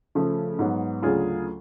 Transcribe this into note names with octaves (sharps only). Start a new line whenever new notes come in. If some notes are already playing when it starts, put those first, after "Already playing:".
C#3 F3 A3
G#2 F#3 B3
D2 C#3 F#3 F4 G#4